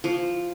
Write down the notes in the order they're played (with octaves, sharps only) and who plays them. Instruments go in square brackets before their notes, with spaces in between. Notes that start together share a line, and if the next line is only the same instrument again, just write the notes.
[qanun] F3